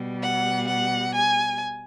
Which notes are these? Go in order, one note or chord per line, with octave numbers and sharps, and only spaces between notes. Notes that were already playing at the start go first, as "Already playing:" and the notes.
Already playing: B2 G3
F#5
F#5
G#5